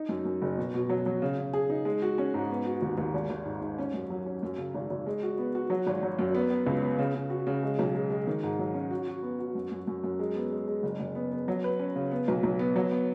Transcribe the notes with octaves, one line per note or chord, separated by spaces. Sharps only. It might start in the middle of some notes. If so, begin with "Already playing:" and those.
Already playing: D#4
F#2
F#2
F#1
B2
B2
F#3
F#3
C#3
C#3
G#4
D#4
G#3
F#4
C#4
G#2
B3
F#4
D#2
D#2
G#1
G#1
G#2
G#2
C#4
F#2
F#3
C#4
F#2
C#3
G#1
G#1
G#3
F#4
B3
F#4
F#3
G#1
F#3
F#2
B3
B3
C#2
B3
C#3
C#3
F#4
C#3
G#3
B1
G#3
G#3
D#3
G#2
F#3
C#4
F#4
F#4
B3
F#4
F#2
F#2
F#2
F#2
G#3
B3
G#3
G#3
F#1
F#1
B3
B3
F#3
B4
C#4
C#3
B3
B1
B1
B3
F#3
B3